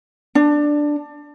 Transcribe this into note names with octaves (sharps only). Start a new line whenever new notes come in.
D4